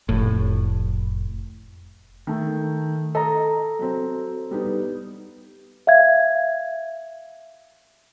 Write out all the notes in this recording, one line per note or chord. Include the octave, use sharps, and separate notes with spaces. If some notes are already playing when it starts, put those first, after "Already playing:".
F1 A2
D#3 A3
A4 D#5 A#5
F#3 C4
G3 B3 D#4
E5 F5 G#6